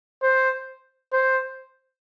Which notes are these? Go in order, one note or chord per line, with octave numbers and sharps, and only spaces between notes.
C5
C5